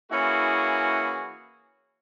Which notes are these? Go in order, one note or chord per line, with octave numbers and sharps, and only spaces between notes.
E3 A#3 C#4 E4 F#4 G#4